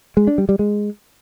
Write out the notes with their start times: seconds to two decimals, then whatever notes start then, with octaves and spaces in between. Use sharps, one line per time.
0.17 G#3
0.27 D4
0.38 G3
0.49 G3
0.59 G#3